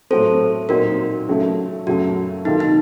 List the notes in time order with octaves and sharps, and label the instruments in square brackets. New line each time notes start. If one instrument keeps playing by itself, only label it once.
[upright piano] A2 F#3 C4 [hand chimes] A4 C5
[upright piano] A#2 F#3 C4 D#4 [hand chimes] F#4 A#4
[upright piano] C#3 F#3 A3
[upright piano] F#2 C#3 F#3 A3 [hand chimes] F#4
[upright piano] C3 D#3 A#3 F4 A4 [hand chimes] D#4
[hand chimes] D#4